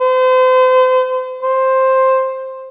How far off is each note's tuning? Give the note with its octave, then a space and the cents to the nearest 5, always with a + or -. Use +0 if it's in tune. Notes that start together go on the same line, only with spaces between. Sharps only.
C5 -35
C5 +10